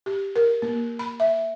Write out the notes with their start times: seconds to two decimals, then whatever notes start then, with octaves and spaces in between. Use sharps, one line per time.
0.06 G4
0.36 A#4
0.62 A#3
0.99 B5
1.20 E5